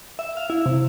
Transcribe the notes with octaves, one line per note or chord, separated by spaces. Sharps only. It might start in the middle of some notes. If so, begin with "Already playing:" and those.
E5
F5
E4
C3